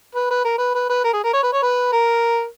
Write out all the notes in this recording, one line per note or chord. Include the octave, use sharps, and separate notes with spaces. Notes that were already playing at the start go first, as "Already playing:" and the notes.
B4
B4
A#4
B4
B4
B4
A#4
G#4
A#4
C#5
B4
C#5
B4
A#4